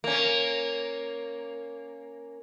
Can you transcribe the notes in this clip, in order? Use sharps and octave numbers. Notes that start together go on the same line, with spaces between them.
A#3 C#4